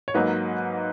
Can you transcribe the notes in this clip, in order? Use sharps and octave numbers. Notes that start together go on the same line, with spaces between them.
C#5
G#2 F#3 A#3 B4 D#5